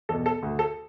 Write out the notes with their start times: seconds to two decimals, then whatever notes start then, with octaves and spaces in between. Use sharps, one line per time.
0.09 E2 B2 A4
0.26 A4
0.43 D2
0.59 A4